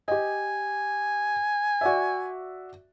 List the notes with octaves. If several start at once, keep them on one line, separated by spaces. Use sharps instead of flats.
G4 D#5 G#5
F#4 D5 E5